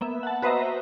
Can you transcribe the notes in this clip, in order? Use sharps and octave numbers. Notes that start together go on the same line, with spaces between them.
A#3 B3 E5
F#5 A5
F#4 B4 C5 D#5 E5 A#5